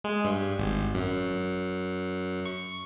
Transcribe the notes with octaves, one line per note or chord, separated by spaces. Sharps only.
G#3
G2
G#1
F#2
C#6